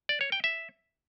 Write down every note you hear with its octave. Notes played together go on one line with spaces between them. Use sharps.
D5
C#5
G5
E5